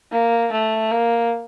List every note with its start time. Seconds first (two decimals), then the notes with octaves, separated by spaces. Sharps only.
0.11 A#3
0.52 A3
0.91 A#3